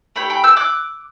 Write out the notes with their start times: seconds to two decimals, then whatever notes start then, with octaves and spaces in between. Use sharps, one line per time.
0.16 A3 D4 G4 G5 B5
0.30 G5 B5
0.44 E6 G6
0.57 D6 F#6